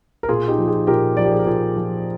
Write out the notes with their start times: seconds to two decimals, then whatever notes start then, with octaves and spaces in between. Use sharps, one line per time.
0.23 A#4
0.29 A#2 F4 G#4
0.48 D#4 G4
0.58 F3
0.68 F4 G#4
0.87 A#2 G4 A#4
1.17 F3 A#4 D5
1.25 G4
1.32 G#4
1.39 A#4
1.46 A#2 G#4 C5
1.76 F3